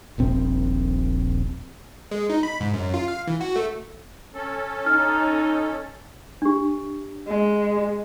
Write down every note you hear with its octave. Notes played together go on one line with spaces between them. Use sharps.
D#1 A#1 C4
G#3
D#4
B5
G#2
F#2
F4
F5
E3
F#4
A3
C#4 A4
D#4 F6
D4 G4
G#3